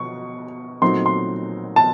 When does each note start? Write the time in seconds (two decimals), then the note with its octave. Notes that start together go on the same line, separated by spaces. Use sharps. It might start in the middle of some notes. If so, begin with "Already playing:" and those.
Already playing: B2 C#6
0.82 A#2 F#3 A3 C4 D#4 C6
1.06 C6
1.76 A5